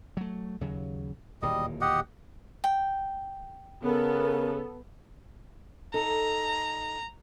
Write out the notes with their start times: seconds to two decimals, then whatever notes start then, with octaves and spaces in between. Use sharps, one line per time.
0.17 F#3 A3
0.61 D#2 C#3 F#3
1.42 D1 D#2 A#2 G3 D#5
1.81 G4 D#5 F#5
2.64 G5
3.84 C#3 B3 A4 A#4
5.94 D#4 A4 A#5